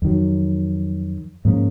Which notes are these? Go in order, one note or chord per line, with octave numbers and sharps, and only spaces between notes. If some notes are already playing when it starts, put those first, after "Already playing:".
F2 D#3 F#3
G#2 F3 A#3 C#4